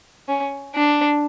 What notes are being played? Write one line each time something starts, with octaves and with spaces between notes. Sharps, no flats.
C#4
D4